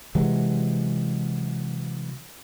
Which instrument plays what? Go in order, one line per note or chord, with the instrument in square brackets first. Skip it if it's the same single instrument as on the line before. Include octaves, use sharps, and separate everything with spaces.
[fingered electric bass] C3 E3 F#3 G#3